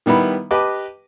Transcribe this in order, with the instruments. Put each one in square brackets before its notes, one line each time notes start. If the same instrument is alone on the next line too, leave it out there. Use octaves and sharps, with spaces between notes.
[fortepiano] D#3 G3 B3 E4 B5
G4 B4 D#5 A5 D6